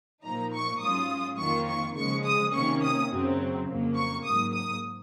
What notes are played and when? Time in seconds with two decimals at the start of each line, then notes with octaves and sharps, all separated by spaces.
0.23 A#2 F3 A#3 D#4 A#5
0.52 C#6
0.80 G#2 F#3 C#4 F4 D#6
1.38 F2 D#3 A#3 F4 C#6
1.67 C#6
1.95 C#3 F3 G#3 C#6
2.24 D#6
2.52 C3 D#3 A#3 C#4 C#6
2.82 D#6
3.11 F#2 C#3 F#3 C4
3.67 F2 C#3 F#3 A#3
3.95 C#6
4.24 G#2 F#3 A#3 D#6
4.53 D#6